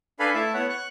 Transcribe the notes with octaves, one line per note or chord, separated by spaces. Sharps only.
D4 A4 B4 F5 G#5 B5
A3 E4 E5 A5
B3 C#5 F#5
C#6 F#6